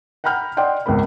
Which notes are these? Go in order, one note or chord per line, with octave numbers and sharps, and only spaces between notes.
F#5 G5 A#5 B5 F6 G6
D5 D#5 F#5 G5 C6
G#1 C#2 B3 A#4 B5